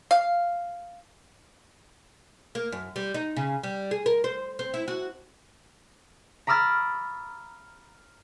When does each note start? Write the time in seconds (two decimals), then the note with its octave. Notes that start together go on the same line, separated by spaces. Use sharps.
0.11 F5
2.55 A#3
2.72 F#2
2.96 G3
3.14 D#4
3.36 C#3
3.63 G3
3.91 G#4
4.06 A#4
4.24 C5
4.59 C4
4.74 E4
4.88 F#4
6.47 A#5 B5 D6 E6 F6 A6